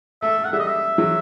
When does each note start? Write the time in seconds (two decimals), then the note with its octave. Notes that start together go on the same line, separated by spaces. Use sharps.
0.22 A3 E5
0.38 A3
0.44 F#5
0.48 A3
0.53 G3 E5
0.59 D#5
0.67 E5
0.98 F#3